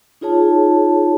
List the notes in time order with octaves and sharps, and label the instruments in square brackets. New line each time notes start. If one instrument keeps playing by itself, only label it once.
[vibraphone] D#4 F4 G#4 C#5 A5